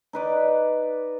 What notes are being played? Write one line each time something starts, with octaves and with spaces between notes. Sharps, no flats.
D#4 B4 D5